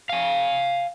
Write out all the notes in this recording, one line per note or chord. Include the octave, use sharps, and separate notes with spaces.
F5 G#5